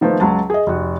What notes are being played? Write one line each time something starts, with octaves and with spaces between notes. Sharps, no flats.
D#3 F3 A3 B3
C#2 F#3 A5
G#4 D#5
F1 F#4